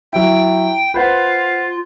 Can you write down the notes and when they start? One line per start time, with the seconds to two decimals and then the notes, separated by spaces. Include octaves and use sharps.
0.13 F#3 E4 G5
0.94 F4 B4 C5 F#5